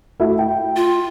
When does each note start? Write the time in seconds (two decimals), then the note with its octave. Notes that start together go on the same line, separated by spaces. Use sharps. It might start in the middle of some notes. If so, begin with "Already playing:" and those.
0.20 A3 E4 F#4
0.39 G5
0.76 F4